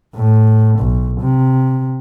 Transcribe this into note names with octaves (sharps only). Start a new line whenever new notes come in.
A2
B1
C3